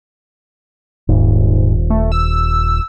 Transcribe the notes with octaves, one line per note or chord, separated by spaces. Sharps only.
D#1 G#2
A3
E6